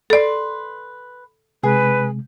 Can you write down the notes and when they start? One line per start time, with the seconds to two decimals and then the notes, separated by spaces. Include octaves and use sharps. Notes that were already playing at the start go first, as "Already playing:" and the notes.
0.10 A4 B4 D5 C6
1.63 C3 G#3 G#4 B4